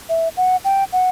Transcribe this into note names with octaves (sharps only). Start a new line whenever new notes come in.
E5
F#5
G5
F#5